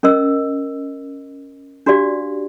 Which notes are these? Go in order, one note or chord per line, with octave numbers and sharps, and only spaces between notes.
C#4 A#4 D#5 E6
D4 F#4 G4 D5 F5